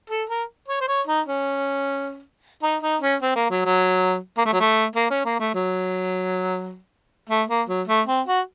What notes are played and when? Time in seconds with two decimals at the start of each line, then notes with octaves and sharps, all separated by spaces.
0.10 A4
0.30 A#4
0.68 C#5
0.81 C5
0.88 C#5
1.07 D#4
1.26 C#4
2.63 D#4
2.82 D#4
3.02 C#4
3.22 C4
3.36 A#3
3.51 F#3
3.65 F#3
4.38 A#3
4.46 A3
4.53 F#3
4.60 A3
4.96 A#3
5.11 C#4
5.25 A#3
5.40 A3
5.55 F#3
7.30 A3
7.49 A#3
7.69 F#3
7.88 A3
8.08 C4
8.27 F#4